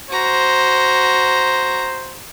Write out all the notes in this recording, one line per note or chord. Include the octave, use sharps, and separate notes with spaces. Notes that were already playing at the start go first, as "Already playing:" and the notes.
F#4 C5 A#5